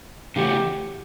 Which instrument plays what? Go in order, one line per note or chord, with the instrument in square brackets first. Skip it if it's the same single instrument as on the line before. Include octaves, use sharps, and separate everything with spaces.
[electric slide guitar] C#3 E3 A3 C#4 F#4 [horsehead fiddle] G4